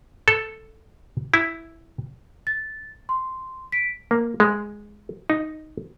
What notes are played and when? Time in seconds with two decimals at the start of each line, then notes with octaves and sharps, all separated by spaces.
0.28 A4
1.34 E4
2.47 A6
3.09 C6
3.72 B6 D7
4.11 A#3
4.40 G#3
5.30 D#4